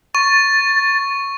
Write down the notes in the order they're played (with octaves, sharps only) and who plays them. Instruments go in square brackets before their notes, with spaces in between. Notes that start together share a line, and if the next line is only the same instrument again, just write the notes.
[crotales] C#6 [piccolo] A6